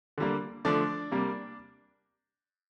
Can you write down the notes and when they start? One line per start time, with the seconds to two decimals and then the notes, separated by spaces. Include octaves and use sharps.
0.18 D3 G3 A#3
0.65 D3 F3 A3 D4 D5
1.11 C3 G3 A#3